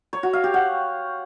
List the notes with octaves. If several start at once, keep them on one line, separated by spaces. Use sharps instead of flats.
C#5
F#4
F5
G4
F#5